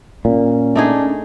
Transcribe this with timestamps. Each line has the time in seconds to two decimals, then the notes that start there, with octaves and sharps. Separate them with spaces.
0.25 A#2 C#4
0.76 A3 D4 D#4 G#4